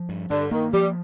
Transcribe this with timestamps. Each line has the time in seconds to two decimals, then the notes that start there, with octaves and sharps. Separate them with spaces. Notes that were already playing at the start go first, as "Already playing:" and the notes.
Already playing: F3
0.09 G2
0.30 G2 D3
0.51 D#3 A#3
0.73 F3 G3